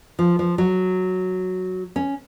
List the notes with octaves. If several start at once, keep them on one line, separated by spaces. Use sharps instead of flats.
F3
F3
F#3
C#4